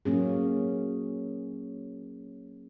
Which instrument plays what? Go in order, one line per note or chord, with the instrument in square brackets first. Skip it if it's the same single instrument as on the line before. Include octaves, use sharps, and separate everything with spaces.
[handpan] F#3 A#3 C#4 G#4